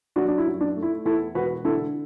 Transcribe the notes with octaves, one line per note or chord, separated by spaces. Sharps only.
F#3 D4 F#4
D4
E4
F#2
D4
A3
E4
E2 E4 A4
E1 F#4 B4
D3 E4 A4